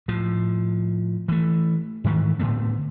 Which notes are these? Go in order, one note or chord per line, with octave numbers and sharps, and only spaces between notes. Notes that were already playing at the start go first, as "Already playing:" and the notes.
A2 F3
E3 A3
G#2 D#3 E3 A3
A2 D3 A3 B3